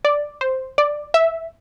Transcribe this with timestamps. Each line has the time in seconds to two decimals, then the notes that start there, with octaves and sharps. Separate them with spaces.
0.05 D5
0.41 C5
0.78 D5
1.14 E5